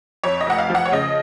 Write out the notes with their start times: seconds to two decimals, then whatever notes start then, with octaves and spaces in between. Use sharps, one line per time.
0.24 F2 C#5
0.41 D#5
0.47 F1 F#5
0.58 F5
0.70 F3
0.75 F#5
0.85 C#5
0.92 C#3 D#5